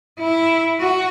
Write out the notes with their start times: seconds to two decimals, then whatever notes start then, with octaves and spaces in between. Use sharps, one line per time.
0.20 E4
0.80 F#4